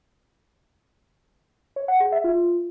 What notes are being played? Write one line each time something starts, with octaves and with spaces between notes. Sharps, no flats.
C#5
F#5
G#4
E5
F4